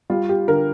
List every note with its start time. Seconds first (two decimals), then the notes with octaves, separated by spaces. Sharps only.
0.10 G3 F4
0.29 G4
0.47 D3 A#4